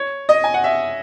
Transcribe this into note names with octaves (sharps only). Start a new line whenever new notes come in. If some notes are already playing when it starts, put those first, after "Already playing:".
Already playing: C#5
D#5
G#5
F#5
E5